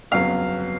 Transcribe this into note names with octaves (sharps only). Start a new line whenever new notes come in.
G1 F2 C#3 F#3 B3 F5